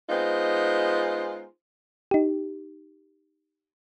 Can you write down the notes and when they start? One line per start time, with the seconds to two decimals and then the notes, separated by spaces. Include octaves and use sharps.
0.09 G#3 B3 D#4 F4 C5
2.11 D#4 G4